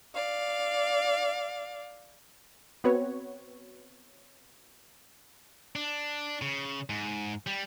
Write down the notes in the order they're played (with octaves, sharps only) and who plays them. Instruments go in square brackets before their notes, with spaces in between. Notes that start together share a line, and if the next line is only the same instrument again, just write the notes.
[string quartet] D5 F5
[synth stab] B3 C4 F#4 B4 C#5
[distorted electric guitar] D4
C#3
G#2
G3